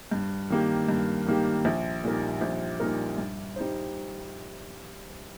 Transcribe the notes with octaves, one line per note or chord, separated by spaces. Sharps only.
G2
D#3 A#3 G4
G2
D#3 A#3 G4
A#1
A#2 G3 D#4 A#4
A#1
A#2 G3 D#4 A#4
G2
G3 D#4 C5